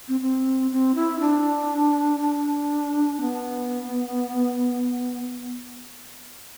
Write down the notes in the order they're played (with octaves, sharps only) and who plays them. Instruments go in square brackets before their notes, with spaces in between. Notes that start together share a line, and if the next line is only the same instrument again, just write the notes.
[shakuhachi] C4
C4
C4
E4
D4
D4
B3